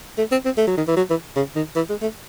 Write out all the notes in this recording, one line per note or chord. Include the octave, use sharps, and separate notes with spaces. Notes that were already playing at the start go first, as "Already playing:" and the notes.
A3
C4
C4
A3
F#3
D#3
E3
F#3
E3
C#3
D#3
E3
G#3
A3